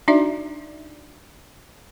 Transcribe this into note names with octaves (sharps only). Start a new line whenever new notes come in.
D4 D#4 F#4 D5 E5